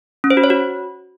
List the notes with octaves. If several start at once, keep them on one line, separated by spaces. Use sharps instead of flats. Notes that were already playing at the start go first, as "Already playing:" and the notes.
C#4
C5
F#4
C#5
F#4